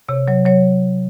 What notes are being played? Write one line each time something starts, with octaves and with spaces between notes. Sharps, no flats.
C3 C#5
F#3 C#5
F#3 C#5